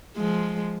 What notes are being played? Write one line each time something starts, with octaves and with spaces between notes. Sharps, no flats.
F3 G#3